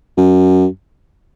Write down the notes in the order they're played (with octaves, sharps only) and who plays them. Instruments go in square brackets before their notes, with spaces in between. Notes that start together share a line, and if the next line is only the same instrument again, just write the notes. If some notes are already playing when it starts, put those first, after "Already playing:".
[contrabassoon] F#2